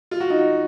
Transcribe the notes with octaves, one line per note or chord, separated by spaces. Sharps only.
F4
F#4
D#4 F4